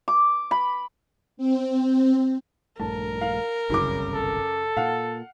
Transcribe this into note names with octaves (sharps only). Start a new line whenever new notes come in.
D6
B5
C4
A#1 G2 A3 A#4 A5
F5
G1 C2 F#2 C#3 D6
A4
A#2 F5 F#5